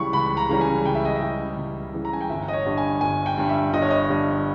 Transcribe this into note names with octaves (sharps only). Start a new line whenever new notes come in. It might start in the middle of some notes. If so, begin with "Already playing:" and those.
Already playing: C#2 C#3 E3 G3 B5 C#6
C#2 B5
A#5
C#3 E3 G3 A#5
G#5
C#2 G5
E5
D#5
E5
C#3 E3 G3
C#2
C#3 E3 G3
A#5
G#5
G5
G1 E5
D#5
C#5
G2 G3
G#5
G1 G#5
G5
G2 G3
E5
G1 D#5
C#5
D#5
G2 G3